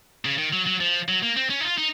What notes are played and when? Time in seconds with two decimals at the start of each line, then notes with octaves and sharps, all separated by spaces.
0.25 C#3
0.38 D#3
0.53 F#3
0.66 F#3
0.80 F3
1.08 F#3
1.23 A#3
1.36 C4
1.50 C#4
1.61 D#4
1.64 F4
1.78 D#4